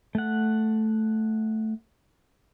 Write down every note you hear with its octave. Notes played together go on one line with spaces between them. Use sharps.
A3 F#5